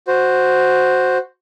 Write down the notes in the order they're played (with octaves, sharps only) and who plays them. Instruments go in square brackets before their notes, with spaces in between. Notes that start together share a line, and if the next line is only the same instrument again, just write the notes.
[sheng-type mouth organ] F#4 C5